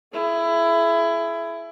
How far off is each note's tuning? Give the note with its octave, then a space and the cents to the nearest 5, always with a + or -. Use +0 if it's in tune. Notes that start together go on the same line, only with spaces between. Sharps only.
E4 +20 G#4 +35